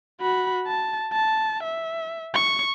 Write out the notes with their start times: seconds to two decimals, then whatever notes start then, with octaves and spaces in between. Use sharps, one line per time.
0.21 F#4 B5
0.67 A5
1.13 A5
1.63 E5
2.34 C#6